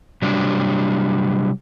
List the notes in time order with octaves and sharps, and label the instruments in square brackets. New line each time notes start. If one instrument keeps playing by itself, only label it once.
[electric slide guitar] C3 F#3 G3 D4